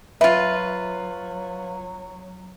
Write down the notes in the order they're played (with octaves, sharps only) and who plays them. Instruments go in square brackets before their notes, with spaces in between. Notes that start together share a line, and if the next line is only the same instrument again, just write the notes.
[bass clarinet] F#3 [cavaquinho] F4 B4 [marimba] E5